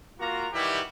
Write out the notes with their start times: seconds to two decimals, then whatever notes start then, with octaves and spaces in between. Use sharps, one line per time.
0.19 A#3 F4 F#4 A#5
0.53 D#3 E3 G3 E4 F#4 G4